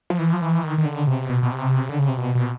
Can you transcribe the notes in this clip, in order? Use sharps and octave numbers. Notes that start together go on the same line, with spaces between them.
F3
E3
F3
E3
D#3
D#3
D3
C3
B2
B2
C3
D3
C#3
C3
B2
B2